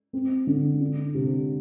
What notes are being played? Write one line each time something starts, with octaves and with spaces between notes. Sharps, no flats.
C4
D3
D4
C3